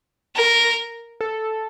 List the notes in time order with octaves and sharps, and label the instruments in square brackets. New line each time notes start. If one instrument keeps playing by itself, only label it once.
[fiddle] A#4
[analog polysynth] A4